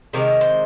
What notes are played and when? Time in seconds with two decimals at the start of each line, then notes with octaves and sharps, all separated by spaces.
0.13 C3 D#3 G#3 A#4
0.41 C5